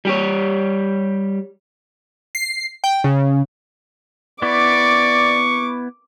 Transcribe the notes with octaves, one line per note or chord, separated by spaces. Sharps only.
G3 G4 C#5
C7
G5
C#3
B3 E4 D5 C#6 D6